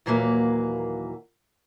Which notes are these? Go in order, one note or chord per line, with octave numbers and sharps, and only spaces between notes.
D#2 A#2 E3 F#3 A#3 B4